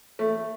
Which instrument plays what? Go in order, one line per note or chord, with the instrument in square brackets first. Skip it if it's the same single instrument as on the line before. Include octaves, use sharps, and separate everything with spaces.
[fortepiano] A3